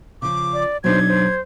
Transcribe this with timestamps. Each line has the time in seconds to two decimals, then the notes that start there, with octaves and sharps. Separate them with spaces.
0.22 C#3 F3 D6
0.54 D5
0.84 B2 F#3 D4 D#4 C5 G#6
1.08 C5